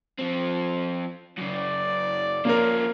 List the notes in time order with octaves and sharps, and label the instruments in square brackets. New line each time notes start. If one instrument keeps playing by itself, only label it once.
[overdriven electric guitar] F3 C4
[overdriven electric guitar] F#2 C#3 [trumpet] D5
[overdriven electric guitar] F3 C#4 [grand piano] A#3 A#4